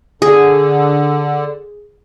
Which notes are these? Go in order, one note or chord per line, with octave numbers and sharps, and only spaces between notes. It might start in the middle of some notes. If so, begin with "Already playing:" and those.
D3 G#4